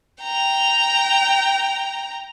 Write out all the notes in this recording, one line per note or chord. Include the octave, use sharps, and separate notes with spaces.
G5 A#5